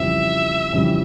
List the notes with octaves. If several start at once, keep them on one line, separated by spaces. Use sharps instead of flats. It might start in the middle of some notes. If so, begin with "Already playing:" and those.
Already playing: F2 C#3 E3 G3 E5
F2 C#3 E3 G3